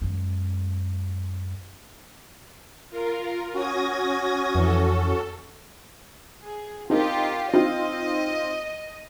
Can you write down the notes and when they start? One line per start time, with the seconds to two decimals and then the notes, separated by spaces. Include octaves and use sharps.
0.02 F#2 G#3
2.90 F4 A#4
3.54 C#4 F#4 D#6 G#6 A#6
4.55 F2 E3 A4
6.44 G#4
6.90 C4 D#4 F4 G4 A#4
7.54 C4 D#4 F4 D#5